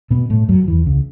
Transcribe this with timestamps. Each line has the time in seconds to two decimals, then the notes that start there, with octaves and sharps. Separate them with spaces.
0.11 B2 B3
0.30 A2 A3
0.49 F#2 F#3
0.64 F#3
0.67 E2 E3
0.86 C#2 C#3